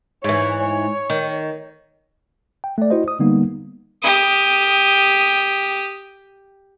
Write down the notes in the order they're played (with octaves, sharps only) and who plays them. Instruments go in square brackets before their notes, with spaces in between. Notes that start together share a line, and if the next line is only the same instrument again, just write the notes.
[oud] G#2 E3 [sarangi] C#5
[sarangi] C#5
[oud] D#3
[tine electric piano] G5
A3 D5
E4 F#4 C5 D#5
D#6
D3 G3 A#3 B3 D#4
[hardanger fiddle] G4 D#6